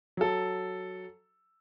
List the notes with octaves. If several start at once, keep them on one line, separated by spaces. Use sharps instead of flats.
F#3 A4